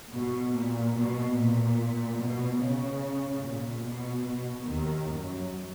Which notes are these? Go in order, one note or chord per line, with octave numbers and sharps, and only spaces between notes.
B2
A#2
B2
A#2
B2
C#3
A#2
B2
B2
D#2 D#3
F#2 F#3